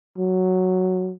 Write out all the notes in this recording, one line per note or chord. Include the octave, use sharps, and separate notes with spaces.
F#3